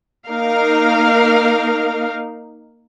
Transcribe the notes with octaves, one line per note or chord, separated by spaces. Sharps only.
A#3 D#4 A#4 F5